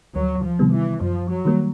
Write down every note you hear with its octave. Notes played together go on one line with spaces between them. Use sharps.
D2 F#3
F3
C3 D#3 G3 B3
E3
F#2 F3
F#3
D#3 G3 A#3